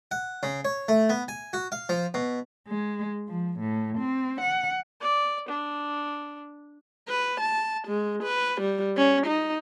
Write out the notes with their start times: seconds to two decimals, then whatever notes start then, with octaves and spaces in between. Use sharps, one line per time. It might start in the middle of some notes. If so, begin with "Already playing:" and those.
0.11 F#5
0.43 C#3
0.65 C#5
0.88 A3
1.09 B3
1.28 G#5
1.53 F#4
1.72 F5
1.89 F3
2.14 B2
2.68 G#3
3.28 F3
3.60 A2
3.99 C4
4.41 F#5
5.01 D5
5.49 D4
7.09 B4
7.41 A5
7.88 G#3
8.23 B4
8.61 G3
8.97 C#4
9.26 D#4